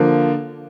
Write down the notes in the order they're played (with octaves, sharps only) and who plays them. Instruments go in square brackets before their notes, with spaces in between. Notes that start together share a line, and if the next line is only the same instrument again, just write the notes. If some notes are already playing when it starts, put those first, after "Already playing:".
Already playing: [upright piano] D3 F3 A#3